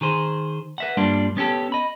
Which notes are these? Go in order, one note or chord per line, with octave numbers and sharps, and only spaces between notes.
D#3 G#4 C5
B4 E5 F#5
G2 G3 A#3 D4 F4
B3 C#4 G4 A4
D#5 B5